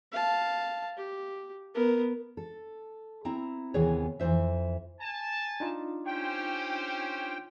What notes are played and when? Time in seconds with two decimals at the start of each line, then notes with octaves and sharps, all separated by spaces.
0.12 F5 A5
0.97 G4
1.74 B3 A#4
2.37 A4
3.25 C4 E4 A#5
3.74 D#2 C3 E3 B3 G#4 C#5
4.20 F2 E3 F3 C5 E5
5.00 G#5 A5
5.60 D4 D#4 F4
6.07 C#4 G4 C5 G5